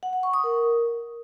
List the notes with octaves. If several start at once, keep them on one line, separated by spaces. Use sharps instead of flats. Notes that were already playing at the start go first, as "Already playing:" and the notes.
F#5
F#5
C#6
D#6
A#4